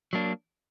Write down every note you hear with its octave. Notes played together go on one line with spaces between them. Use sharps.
F#3 A#3 D4